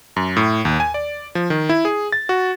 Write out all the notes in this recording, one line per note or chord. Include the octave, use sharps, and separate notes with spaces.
F#2
A2
D#2
G#5
D5
F3
D#3
E4
G#4
A6
F#4